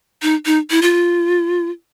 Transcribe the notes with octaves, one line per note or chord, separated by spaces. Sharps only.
D#4
D#4
E4
F4